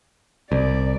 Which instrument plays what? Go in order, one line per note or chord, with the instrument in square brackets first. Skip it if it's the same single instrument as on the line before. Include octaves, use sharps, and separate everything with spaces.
[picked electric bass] C2 [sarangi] D5